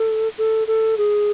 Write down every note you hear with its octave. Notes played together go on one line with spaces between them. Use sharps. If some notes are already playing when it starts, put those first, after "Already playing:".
Already playing: A4
A4
A4
G#4